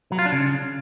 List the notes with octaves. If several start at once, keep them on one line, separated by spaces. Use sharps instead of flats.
F#3
F4
D4
C#3